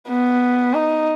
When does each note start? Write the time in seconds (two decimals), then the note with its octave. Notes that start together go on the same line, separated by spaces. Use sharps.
0.09 B3
0.74 D#4